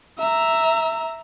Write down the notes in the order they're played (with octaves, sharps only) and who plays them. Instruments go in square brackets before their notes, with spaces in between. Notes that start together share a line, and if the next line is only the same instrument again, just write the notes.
[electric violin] E5 A#5